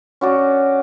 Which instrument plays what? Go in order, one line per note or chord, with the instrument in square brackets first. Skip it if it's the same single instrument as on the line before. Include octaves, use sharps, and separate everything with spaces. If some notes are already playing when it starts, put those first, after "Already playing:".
[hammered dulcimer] C#4 F#4 D5